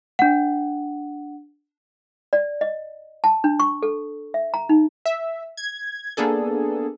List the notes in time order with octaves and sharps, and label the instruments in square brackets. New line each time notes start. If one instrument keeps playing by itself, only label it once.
[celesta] D4 F#5
[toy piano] D5
D#5
A5
D4
C#6
A4
E5
A#5
D#4
[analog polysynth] E5
G#6
A#3 B3 D4 G#4 A4